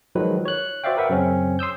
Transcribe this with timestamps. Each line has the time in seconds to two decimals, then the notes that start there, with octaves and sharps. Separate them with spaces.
0.15 D#3 F3 F#3 G#3 B4
0.45 C#5 F#6
0.84 F#4 C5 D5 E5 F5 G5
0.97 A#4 B4 E5 F#5 G5
1.09 F#2 C#3 C4 C#4
1.59 C6 D#6 E6 G6